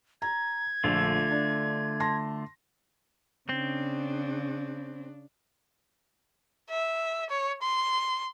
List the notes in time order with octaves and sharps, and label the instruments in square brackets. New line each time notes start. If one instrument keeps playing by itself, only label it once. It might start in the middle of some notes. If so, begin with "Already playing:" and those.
[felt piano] A#5 [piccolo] G#6
[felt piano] A#1 [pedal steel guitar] D3 A3 F4
[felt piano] D4
A5 C6 A#6
[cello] C#3 D4 [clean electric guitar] C4
[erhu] E5
C#5
C6